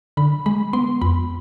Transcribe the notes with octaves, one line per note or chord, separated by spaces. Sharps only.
D3 B5
G#3 B5
B3 C6
F2 B5